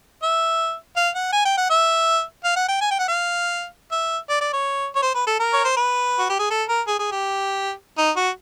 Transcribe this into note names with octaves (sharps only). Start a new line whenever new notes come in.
E5
F5
F#5
G#5
G5
F#5
E5
F5
F#5
G5
G#5
G5
F#5
F5
E5
D5
D5
C#5
C#5
C5
B4
A4
A#4
C#5
C5
B4
F#4
G4
G#4
A4
A#4
G#4
G#4
G4
D#4
F#4